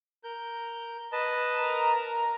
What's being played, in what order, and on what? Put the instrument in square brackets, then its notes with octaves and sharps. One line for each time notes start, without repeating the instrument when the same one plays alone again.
[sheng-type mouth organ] A#4 G6
B4 D#5 A5
[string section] A#4 A#5